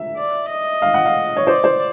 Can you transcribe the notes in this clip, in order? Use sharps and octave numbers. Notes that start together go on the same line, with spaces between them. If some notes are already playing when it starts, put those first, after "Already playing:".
Already playing: E5
D5
D#5
F5
F#5
F5
C#5
C5 D5
C5